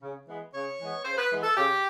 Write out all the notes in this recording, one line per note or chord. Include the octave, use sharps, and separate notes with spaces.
C#3
E3 G#3 B3
C#3 C#5
E3 G#3 B3
C#3 C5
B4
E3 G#3 B3
A4
C#3 G4